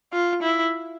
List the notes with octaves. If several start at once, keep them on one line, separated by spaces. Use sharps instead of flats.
F4
E4